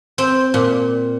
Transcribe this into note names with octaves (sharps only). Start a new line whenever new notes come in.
C4
A#2